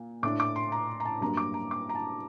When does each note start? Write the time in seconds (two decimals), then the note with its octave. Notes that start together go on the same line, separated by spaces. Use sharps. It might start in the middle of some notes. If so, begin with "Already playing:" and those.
Already playing: A#2
0.23 A2 A3 D4 D6
0.40 D6
0.56 C6
0.72 A#5
1.00 A#5
1.05 A5
1.21 G2 F#3 A#3 D4 A#5
1.37 D6
1.54 A#5
1.71 D6
1.89 A#5
1.95 A5